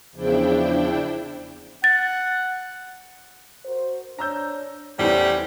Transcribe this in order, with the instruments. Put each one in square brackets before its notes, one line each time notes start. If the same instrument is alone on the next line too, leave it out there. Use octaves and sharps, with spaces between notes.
[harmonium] E2 C#3 F3 [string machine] D4 E4 G5
[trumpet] F#5 [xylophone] A6
[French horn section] F#4 A#4 C5
[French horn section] D4 C#5 [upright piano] A#5 E6 G6
[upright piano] E2 E3 [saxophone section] A2 G3 [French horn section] C#4 C5